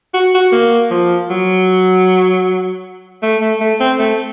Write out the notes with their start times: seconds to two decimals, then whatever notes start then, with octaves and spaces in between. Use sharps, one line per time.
0.14 F#4
0.35 F#4
0.52 A#3
0.91 F3
1.29 F#3
3.22 A3
3.41 A3
3.60 A3
3.80 C4
3.99 A3